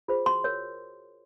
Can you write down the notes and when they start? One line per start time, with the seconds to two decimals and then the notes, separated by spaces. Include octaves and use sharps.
0.08 F4 G#4 C5
0.26 F#4 C6
0.44 A#4 C#5